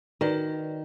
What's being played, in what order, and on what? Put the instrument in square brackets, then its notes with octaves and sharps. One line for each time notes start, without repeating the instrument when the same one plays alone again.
[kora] D#3 [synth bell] F#4 B4 D5